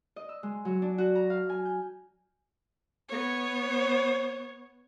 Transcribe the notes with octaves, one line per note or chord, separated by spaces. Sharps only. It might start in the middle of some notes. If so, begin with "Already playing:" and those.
D#5
E6
G#3
F#3
D4
F#4
A#5
F5
G#5
G6
B3 C#5